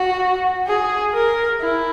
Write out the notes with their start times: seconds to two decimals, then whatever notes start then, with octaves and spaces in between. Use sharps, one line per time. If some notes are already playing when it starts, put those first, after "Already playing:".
Already playing: F#4
0.66 G#4
1.14 A#4
1.61 E4